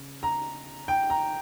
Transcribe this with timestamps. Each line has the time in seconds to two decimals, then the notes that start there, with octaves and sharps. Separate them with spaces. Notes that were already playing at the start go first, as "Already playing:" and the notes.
Already playing: C#3
0.23 A#5
0.88 G5
1.10 A#5